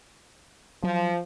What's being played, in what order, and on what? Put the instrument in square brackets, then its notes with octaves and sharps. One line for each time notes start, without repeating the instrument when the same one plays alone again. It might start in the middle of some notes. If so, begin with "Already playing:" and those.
[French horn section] F3 [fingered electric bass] F#3